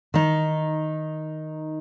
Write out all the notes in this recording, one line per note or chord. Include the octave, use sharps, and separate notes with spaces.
D#3 D#4